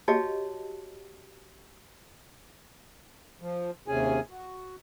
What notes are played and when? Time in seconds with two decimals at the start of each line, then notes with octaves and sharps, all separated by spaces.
0.08 F#4 G4 C#5 D#5 F5 A5
3.41 F3
3.88 D#2 C3 C#4 G#4 G#5
4.30 F#4